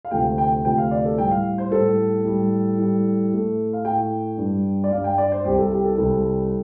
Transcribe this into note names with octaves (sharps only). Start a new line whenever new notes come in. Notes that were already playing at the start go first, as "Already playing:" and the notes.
F5
D2 C3 F3 A3 G5
G5
D2 C3 F3 A3 G5
F5
D5
A4
A2 G3 G5
F5
C5
A2 G3 A4
A2 G3
A2 G3
A2 A3
F5
A2 A3 G5
G2 G3
D5
G2 G3 F5
G5
D5
C5
C2 C3 G3 G4
A4
G4
A4
C2 C3 G3 A4